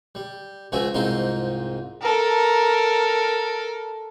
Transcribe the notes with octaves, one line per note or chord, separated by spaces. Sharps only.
G3
C#2 F3 F#4 G#4 E5
C2 G#2 C4 D#4 F4 C6
A4 A#4